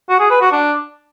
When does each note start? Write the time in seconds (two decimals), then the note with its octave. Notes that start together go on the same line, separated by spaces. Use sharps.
0.09 F#4
0.20 G#4
0.31 B4
0.41 F#4
0.52 D4